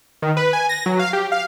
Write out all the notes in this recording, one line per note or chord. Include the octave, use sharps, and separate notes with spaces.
D#3
B4
G#5
A#6
F#3
F5
G4
F5